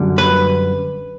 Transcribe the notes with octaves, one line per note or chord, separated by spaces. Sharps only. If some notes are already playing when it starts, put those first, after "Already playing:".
Already playing: F#2 D3 G3
B4